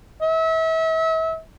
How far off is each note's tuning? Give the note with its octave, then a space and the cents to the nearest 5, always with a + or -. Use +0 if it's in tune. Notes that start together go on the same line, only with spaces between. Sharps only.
E5 -35